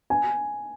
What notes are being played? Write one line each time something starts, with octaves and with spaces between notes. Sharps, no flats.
G#5